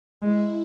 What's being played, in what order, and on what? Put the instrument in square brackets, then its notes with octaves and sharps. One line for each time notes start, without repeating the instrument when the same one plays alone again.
[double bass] G#3 [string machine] E4